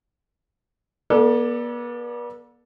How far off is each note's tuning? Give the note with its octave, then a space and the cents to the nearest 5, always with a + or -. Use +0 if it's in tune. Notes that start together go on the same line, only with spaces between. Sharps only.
B3 -45 A4 +0 D5 +0